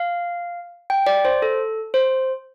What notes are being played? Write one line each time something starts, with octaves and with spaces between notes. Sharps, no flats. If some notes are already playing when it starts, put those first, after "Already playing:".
Already playing: F5
G5
D5
C5
A4
C5